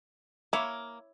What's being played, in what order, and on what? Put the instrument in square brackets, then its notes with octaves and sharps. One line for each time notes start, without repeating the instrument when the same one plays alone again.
[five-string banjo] A#3 [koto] E4 C#5